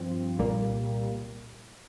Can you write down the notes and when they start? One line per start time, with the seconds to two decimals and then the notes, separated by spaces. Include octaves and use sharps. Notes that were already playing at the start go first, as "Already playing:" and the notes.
Already playing: G2 F3 C4
0.39 C2 A#2 G3 A#3